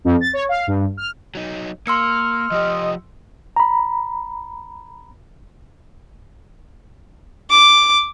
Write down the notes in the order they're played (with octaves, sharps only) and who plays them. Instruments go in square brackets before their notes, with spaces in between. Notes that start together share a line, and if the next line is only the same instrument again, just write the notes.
[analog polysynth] F2
A6
C#5
F5
G2
F6
[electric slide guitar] F#3 D#4
[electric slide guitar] A#3 [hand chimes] C6 E6 C#7 [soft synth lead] F6
[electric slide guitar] F3 G4 [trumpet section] D#5
[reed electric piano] A#5 B5
[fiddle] D6